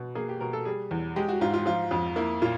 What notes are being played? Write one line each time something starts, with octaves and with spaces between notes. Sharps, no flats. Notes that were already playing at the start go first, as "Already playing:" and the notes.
Already playing: B2
A#3 G#4
G4
B2 A#4
A4
G3 G#4
E2
G#3 G4
F#4
G#2 F4
F4
F3 F4
F2
A#3 E4
A#2 F4